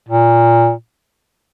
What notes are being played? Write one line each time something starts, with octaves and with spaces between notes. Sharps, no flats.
A#2